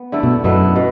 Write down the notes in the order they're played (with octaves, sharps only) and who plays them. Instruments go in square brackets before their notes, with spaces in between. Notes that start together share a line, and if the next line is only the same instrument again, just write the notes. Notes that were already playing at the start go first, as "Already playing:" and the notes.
Already playing: [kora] B3
D3 A3 E4 A4
[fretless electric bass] B2
[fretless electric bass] F#2 [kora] B2 B3 E4 A4
[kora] B2